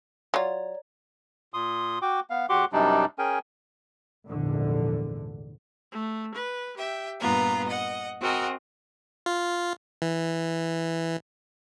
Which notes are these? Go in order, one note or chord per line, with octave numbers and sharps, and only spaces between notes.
F#3 F4 C#5 D5 A#5
A#2 C6 D#6
F#4 G5 D6
B3 F5
E2 F#4 G4 F#5 C6 D6
F#2 C3 G3 D4 D#4
C#4 G#4 A#4 G5 G#5
F1 A#1 E2 G#2 D3
A3
B4
G4 E5 G5
G2 A#2 B3 F4 A#5
D#5 F#5
C4 F#4 G#4 A#4 D#5 F#5
F4
E3